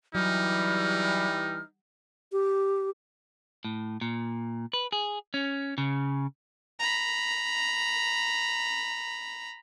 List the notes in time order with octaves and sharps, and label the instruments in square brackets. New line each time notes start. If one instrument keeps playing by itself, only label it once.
[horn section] E3 G3 [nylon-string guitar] F#3 [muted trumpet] D#4 [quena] F6
[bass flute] G4
[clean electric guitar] A2
A#2
B4
G#4
C#4
C#3
[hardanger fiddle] A#5 B5